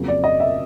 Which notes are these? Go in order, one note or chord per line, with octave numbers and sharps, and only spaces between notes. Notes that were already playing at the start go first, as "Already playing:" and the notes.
Already playing: F2 C#3 F#3 A#3
D5
D#5
E5